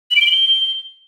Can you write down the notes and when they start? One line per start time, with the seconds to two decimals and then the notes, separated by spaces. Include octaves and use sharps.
0.11 F#7
0.16 D7
0.21 G7
0.26 F#7
0.31 G7